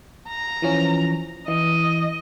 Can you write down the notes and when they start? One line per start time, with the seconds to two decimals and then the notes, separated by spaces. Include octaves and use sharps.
0.29 A#5
0.62 E3 F3 C#4
1.48 E3 D#5